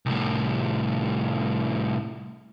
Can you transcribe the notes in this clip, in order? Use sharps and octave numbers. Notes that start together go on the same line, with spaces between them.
C2 A2